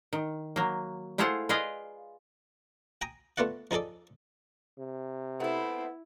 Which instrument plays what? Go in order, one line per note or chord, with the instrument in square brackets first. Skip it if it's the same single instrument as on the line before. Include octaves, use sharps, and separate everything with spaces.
[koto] D#3
F#3 A#3
A3 E4 F4 G#4 C5 F#5
F4 G#4 B4 D5 D#5 F5
[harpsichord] G5 G#5 A#5 D#6
A3 B3 F4 D5 F#5
F3 D#4 G#4 A4 D5
[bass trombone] C3
[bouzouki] A3 C4 [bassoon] B3 [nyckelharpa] E4